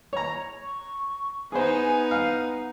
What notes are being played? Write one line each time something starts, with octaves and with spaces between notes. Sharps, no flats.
C#5 A#5
C#6
B3 D#4 G#4 C5 G#5
F5 F#5